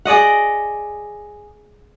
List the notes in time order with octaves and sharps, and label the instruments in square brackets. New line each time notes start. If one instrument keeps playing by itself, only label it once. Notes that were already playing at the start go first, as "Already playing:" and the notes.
[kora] G#4 D5 D#5 F#5